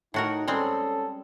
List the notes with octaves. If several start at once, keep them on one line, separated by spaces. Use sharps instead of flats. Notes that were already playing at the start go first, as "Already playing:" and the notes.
A2 D#4 F#4 A#4
G3 G#3 C4 C#4 A4